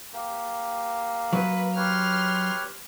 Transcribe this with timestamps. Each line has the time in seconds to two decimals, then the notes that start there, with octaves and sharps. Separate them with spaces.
0.14 A#3 G4
1.33 F#3 B4
1.76 G4 B4 C#5 C6 F6